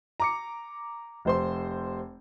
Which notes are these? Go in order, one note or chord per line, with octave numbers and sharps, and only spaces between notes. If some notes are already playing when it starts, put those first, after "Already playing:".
A#5 D6 C#7
F1 C5 C6